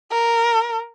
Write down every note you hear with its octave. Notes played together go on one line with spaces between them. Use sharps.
A#4